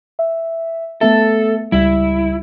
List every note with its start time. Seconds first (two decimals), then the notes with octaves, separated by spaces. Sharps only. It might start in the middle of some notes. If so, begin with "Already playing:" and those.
0.19 E5
1.01 A3 B3 A4 E5
1.72 C#2 G3 E4